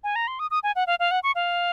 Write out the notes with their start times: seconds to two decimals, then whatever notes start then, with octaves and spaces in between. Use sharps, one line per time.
0.04 G#5
0.16 A#5
0.27 C6
0.39 D#6
0.51 D#6
0.63 G#5
0.75 F#5
0.87 F5
0.99 F5
1.11 F#5
1.23 C#6
1.35 F5